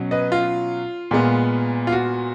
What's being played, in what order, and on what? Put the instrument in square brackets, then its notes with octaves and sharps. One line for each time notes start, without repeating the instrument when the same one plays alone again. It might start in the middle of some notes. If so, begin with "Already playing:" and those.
Already playing: [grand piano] B2 F#3 C#4
B4 D#5
F4
A#2 G#3 B3
F4
F#4